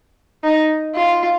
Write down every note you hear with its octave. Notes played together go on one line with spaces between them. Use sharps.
D#4
F4